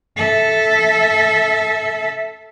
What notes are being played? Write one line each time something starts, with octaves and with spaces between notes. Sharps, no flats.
A4 E5